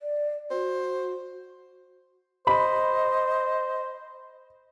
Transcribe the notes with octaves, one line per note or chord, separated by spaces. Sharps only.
D5
F#4 C5
C5 D#5 B5